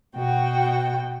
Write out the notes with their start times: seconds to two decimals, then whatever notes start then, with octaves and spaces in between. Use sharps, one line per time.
0.16 B2 F#4 G5